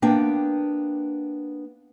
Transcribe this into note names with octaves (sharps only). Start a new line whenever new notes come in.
A#3 B3 D4 G5